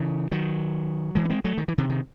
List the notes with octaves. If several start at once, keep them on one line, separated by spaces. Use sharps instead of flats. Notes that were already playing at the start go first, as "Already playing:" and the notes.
Already playing: C#3 E3
D#3 F#3
E3 G#3
C#4
G#3 C4
F#3 A3
D#3
E3
C3 D#3
D#3